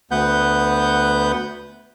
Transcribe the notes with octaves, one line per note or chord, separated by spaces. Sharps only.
D2 B3 B4 F#5 G6